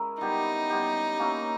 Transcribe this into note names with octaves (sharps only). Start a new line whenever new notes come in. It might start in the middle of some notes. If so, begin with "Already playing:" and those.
Already playing: G#3 C#4 E4 A#4
G3 B3 D#4 G4
G3 B3 G4
A#3 C#4 E4